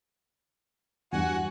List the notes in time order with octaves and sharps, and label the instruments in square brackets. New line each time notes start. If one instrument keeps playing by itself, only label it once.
[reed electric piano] E2 G2 [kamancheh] F#4 [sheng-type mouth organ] F#5 G#5